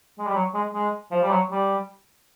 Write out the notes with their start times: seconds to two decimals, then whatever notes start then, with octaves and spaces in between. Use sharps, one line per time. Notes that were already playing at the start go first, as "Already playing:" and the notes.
0.19 G#3
0.26 G3
0.35 F#3
0.54 G#3
0.74 G#3
1.11 F3
1.22 G3
1.31 F#3
1.51 G3